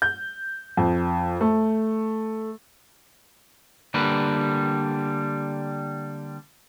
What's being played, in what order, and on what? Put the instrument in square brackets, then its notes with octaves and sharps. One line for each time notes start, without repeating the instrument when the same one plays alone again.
[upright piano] G6
F2
A3
[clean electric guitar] D3 G3 A#3 B4